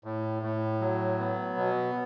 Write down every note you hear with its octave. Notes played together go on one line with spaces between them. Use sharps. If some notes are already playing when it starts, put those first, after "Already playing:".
A2
A2
F#3
B3
B2